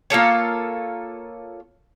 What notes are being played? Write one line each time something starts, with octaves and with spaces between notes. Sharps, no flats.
A#3 F4 A4 C#5